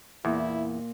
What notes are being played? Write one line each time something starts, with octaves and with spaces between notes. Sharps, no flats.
E2 A#2 E4